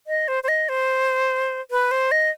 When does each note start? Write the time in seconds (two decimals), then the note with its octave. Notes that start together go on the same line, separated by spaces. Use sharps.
0.07 D#5
0.28 C5
0.43 C5
0.48 D#5
0.69 C5
1.71 B4
1.91 C5
2.11 D#5